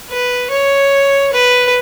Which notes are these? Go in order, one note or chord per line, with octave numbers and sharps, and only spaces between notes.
B4
C#5
B4